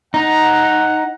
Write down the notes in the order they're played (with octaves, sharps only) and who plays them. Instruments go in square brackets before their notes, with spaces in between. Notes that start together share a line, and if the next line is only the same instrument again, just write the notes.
[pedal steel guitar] D#4 [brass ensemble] F#5 [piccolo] A#5